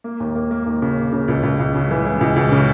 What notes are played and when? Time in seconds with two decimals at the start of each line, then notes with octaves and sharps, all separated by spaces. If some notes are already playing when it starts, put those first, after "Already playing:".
0.04 A#3
0.20 D#2
0.35 A#3
0.51 A#3
0.66 D#2
0.82 C#3
0.97 A#3
1.12 C#3
1.28 C#2
1.43 C#2
1.59 C#2
1.75 C#3
1.91 E3
2.06 E3
2.21 C#2
2.36 C#2
2.52 C#3